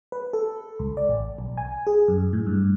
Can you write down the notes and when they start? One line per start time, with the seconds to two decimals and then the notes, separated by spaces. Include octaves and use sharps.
0.12 B4
0.33 A4
0.79 C#2
0.97 D5
1.09 A1
1.38 B1
1.58 G#5
1.87 G#4
2.08 F#2
2.33 A2
2.46 G2